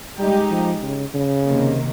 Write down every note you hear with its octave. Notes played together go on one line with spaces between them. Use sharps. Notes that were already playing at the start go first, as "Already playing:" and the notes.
G3 G#3 D#4 G4
F3
C#3
C#3
C3 D#3 A#3